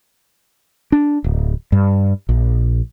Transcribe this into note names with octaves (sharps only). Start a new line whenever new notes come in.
D4
D1
G2
A#1